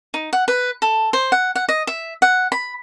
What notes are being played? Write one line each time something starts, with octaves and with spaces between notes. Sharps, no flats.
D#4
F#5
B4
A4
C5
F#5
F#5
D#5
E5
F#5
B5